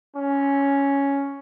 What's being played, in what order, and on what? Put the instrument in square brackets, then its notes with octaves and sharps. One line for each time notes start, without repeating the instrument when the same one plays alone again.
[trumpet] C#4